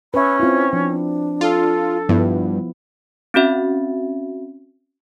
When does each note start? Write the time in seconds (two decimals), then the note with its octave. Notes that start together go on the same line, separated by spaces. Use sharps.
0.14 C#4 B4 E5 B5
0.40 C4 E4 F4
0.73 F3 D4
1.41 F4 A4
2.09 G2 F3 B3 E4
3.34 C4 C#4 F#4 E5